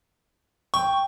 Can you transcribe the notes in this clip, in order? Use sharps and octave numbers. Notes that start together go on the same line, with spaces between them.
G5 C#6